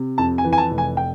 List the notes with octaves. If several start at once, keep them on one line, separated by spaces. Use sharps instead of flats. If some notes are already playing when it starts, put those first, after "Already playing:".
Already playing: C3
F2 A5
G#5
E3
G#5
A5
F1
G#5
G5